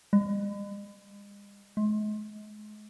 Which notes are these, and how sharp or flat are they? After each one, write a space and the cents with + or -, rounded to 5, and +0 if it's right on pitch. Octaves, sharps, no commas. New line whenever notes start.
G#3 -45
G#3 +35